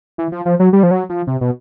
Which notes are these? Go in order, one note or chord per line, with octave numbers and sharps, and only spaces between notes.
E3
F3
F3
F#3
G3
F3
F#3
F3
C3
B2